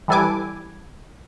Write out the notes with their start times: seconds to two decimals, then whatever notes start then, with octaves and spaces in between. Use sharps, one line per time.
0.08 E3 G3 A4 B4 G#5 D6